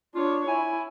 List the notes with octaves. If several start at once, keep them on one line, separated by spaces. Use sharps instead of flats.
D4 F4 C#5
E4 G#5